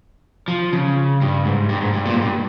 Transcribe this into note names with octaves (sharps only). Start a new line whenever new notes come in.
F3
C#3
G2
G#2
G2
G#2
G2
A#2
G#2
G2